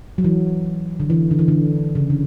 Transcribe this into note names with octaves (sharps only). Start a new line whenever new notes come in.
F#3
E3
D3
E3
D3
E3
D3
C#3
D3